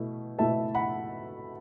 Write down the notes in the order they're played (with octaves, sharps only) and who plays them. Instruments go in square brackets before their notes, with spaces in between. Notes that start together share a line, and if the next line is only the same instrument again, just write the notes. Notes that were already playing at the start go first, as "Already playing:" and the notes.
Already playing: [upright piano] B2 A3 E4
[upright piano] B2 A3 E4 A4 [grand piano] E5 A5
[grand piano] F#5 B5